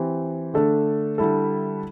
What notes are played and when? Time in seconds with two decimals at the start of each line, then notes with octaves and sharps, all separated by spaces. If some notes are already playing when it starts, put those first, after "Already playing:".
Already playing: E3 C4 G4
0.54 D3 A3 D4 A4
1.18 D3 G3 E4 A4